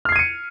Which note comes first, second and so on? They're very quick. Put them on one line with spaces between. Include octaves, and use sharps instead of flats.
F6 C7 G#6 D#7 C#7